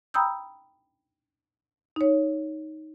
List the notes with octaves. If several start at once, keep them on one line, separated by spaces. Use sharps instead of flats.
G5 A#5 B5 D#6 E6 G6
D#4 C#5